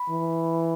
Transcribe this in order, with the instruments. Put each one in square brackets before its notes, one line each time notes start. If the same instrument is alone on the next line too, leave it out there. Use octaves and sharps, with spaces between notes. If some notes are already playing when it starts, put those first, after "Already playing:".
Already playing: [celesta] B5
[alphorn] E3